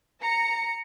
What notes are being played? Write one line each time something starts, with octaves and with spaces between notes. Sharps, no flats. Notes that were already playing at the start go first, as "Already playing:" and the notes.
A#5 C#7